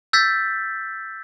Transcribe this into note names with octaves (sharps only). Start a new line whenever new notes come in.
E6 G6 A6 B6